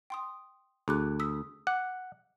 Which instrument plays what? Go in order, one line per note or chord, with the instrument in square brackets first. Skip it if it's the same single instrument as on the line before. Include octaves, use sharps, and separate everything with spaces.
[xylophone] G5 C6 D#6
[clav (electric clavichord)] D2 [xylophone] G#4 D6 F#6
[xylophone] D#6 E6 B6
[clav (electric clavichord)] F#5 [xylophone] D6